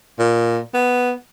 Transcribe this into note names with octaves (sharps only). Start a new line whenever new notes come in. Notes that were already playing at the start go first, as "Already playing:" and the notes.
A#2
B3